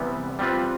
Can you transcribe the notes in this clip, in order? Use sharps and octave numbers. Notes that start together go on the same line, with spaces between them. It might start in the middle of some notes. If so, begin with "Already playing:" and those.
Already playing: C3 E3 G3 B3
G3 C4 F4 B4